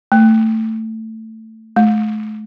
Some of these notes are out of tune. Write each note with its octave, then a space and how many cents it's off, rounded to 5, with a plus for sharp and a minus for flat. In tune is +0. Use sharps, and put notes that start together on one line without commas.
A3 +15
A3 -35